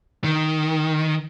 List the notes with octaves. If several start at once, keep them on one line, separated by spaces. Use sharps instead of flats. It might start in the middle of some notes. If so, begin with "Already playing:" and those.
D#3